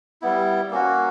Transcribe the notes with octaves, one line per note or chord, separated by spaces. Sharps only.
G3 B3 E4
A#3 C#4 F#4